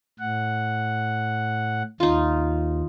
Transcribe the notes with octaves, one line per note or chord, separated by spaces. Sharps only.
A2 F#5
D#2 D#4 F4